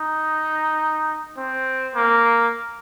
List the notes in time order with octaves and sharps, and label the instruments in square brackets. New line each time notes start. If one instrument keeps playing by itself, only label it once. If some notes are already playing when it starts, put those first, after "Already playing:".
Already playing: [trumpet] D#4
C4
A#3